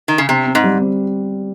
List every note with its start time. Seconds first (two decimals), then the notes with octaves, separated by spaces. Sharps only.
0.08 D#3
0.18 C#3
0.29 C3 C4
0.46 C4
0.55 G#2
0.64 G3
0.80 C4